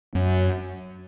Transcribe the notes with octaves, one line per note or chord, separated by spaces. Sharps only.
F#2